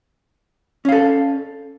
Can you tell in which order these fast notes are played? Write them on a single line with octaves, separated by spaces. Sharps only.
C#4 F5 A4